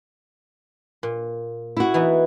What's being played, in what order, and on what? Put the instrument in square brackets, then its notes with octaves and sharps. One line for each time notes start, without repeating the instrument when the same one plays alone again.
[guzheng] A#2
[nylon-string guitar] E4 F#4
[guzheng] E3 B3 D#4